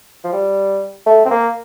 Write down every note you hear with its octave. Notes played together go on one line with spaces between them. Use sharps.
F3
G3
A3
C4
A#3